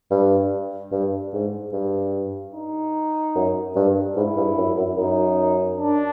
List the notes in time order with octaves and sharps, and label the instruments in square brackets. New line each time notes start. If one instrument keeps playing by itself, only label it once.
[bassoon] G2
G2
G#2
G2
[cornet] D#4
[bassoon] F#2
G2
[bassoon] G#2 [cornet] E4
[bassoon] G2
F#2
F#2
[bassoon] F#2 [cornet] D#4
[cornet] D4